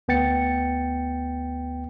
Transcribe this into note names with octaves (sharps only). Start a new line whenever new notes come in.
D2 B3 G5 A6 C#7